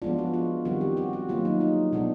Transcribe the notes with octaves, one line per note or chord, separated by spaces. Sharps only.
F3 G#3 B3 D4 F4
F#4
F4
D#3 G3 C4 F#4
G4
F#4
F#4
D#3 F#3 A#3 F4
D#4
D#4
B2 G#3 B3 D4